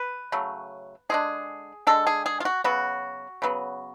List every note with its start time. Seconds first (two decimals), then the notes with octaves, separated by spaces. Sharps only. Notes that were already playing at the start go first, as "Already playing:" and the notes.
Already playing: B4
0.32 C#3 F#3 A3
1.09 D3 G#3 D4 G#4
1.87 D3 G#3 D4 A4
2.07 G#4
2.26 G#4
2.40 F4
2.45 F#4
2.64 C#3 F#3 B3 F#4
3.42 C#3 F#3 B3